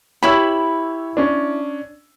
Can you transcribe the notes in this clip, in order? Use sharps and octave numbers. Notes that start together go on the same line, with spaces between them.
E4 G4 C#5 B5 E6
C#4 D4